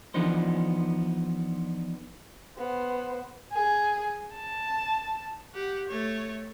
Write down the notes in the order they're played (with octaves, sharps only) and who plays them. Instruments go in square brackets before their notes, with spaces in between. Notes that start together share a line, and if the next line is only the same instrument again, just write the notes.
[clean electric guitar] E3 F3 B3 D4 D#4 C5
[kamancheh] B3 C5
[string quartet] G#4
A5
[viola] G4 F#5
A3 C#5